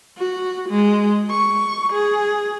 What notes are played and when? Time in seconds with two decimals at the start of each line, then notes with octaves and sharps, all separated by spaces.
0.18 F#4
0.70 G#3
1.31 C#6
1.93 G#4